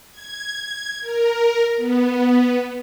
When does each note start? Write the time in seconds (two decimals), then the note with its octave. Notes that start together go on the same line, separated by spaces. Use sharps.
0.11 G#6
1.01 A#4
1.77 B3